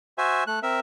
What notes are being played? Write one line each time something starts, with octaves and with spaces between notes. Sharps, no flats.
F#4 C5 E5 G#5
A3 F#6
C4 A#4 E5